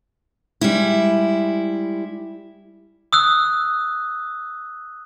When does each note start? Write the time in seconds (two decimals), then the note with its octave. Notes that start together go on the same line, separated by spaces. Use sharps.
0.61 G3 G#3 E4
3.13 D#6 E6 F#6